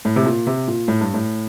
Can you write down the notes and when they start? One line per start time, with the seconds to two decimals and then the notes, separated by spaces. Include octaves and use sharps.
0.05 A2
0.16 C3
0.26 A#2
0.47 C3
0.68 A#2
0.88 A2
1.01 G2
1.14 A2